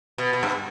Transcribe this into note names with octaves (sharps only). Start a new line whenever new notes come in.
B2
B2
G2